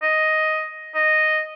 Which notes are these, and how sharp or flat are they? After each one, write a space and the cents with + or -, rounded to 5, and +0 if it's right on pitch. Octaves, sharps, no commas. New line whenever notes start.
D#5 +5
D#5 -5